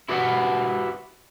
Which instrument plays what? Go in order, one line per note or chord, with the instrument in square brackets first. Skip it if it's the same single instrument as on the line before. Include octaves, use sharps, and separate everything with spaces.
[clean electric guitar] E4 F#4 G4 B4 D#5 F#5